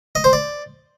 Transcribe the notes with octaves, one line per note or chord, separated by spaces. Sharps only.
D#5
C5
D5